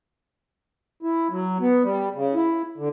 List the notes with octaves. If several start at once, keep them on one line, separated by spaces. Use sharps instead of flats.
E4
F#3
B3
G3
C#3
E4
D3